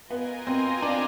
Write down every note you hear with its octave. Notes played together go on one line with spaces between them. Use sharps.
B3 F4 A#4 D#5 G#5
C4
D4